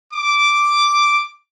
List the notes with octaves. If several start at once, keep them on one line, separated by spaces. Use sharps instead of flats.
D6